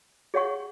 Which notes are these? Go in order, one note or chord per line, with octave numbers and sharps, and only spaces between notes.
G#4 C#5 F#5 C#6